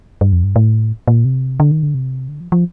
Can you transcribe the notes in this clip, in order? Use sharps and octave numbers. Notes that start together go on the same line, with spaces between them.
G2
F2
G2
A2
A#2
C3
D3
D#3
D3
C3
D3
F3
F3